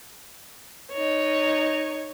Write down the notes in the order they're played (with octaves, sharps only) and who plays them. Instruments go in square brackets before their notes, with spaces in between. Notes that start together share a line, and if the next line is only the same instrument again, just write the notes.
[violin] D#4 C#5